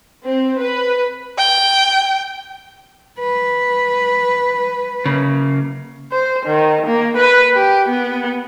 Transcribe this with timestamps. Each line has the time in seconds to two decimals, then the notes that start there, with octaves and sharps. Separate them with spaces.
0.25 C4
0.61 B4
1.38 G5
3.19 B4
5.06 C#3 A#3
6.12 C5
6.46 D#3
6.87 A#3
7.17 B4
7.55 G4
7.89 B3